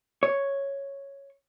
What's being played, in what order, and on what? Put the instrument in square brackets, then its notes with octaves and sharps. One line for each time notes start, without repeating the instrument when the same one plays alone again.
[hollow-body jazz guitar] C#5